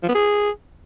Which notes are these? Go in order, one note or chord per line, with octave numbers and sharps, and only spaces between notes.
F3
B3
G#4